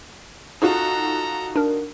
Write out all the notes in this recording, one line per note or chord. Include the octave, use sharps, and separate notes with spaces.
D#4 F4 F#4 A4 A#5
D4 A#4